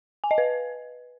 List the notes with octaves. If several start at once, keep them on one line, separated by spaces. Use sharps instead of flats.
G#5
D#5
B4